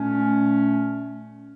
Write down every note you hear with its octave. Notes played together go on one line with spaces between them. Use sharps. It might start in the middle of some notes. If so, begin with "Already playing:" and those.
Already playing: A#2 A3 C#4